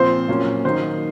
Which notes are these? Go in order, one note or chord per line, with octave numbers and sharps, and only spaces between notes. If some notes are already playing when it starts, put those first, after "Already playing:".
Already playing: A#2 F3 C4 C5
A#2 F#3 A#3 C#4
D#3 F#3 A#3 D#4 C5